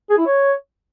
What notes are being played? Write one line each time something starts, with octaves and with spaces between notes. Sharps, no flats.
G#4
E4
C#5